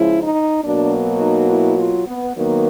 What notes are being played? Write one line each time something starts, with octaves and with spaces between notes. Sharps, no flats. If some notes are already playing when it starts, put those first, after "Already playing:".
Already playing: C#3 F3 G#3 E4
D#4
B2 F#3 A#3 D4
D#4
E4
F4
B3
D#3 F#3 A#3 B3